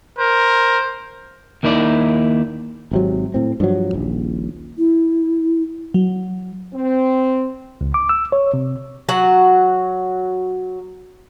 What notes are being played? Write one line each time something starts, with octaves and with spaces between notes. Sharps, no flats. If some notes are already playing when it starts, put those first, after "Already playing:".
A#4 C5
D#2 A#3 D#4 E4 D5
G#1 C3 F#3
A2 C4
G2 F3 F#3
D#1 A#1
E4
F#3
C4
C#2
D6
E6
C#5
C3
F#3 F#4 F#5